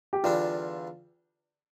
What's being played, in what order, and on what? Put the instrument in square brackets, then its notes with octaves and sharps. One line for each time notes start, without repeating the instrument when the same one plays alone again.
[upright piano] G4
[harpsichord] E2 D3 G3 D4 [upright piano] F4